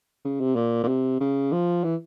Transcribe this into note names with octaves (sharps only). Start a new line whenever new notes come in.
C#3
C3
A#2
A#2
C3
C#3
F3
E3